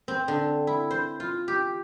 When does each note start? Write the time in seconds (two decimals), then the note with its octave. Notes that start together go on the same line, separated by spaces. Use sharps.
0.08 C4
0.28 D3
0.67 E4
0.91 C5
1.20 F4
1.48 G4